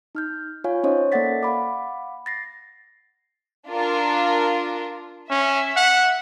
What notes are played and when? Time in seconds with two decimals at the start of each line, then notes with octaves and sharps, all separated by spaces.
0.15 D#4 F6 G6
0.64 F4 C#5 F5 G#5
0.83 C#4 D#4 C5 C#5 D#5
1.12 A#3 A4 D5 F#5 A6 B6
1.43 F5 F#5 B5 D6
2.26 A6 A#6 C7
3.67 D4 F4 A#4
5.30 C#4 E5
5.76 F#5